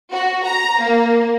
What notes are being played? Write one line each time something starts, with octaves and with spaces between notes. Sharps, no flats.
F#4
A#5
A#3